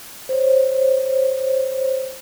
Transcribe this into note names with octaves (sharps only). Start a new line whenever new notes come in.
C5 C#5